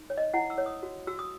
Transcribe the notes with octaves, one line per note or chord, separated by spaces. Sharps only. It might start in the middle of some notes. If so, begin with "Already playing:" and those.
Already playing: D#4
C#5
D#5
E4 F#5
E6
C#5
D#6
F#4
F#4 E6
D#6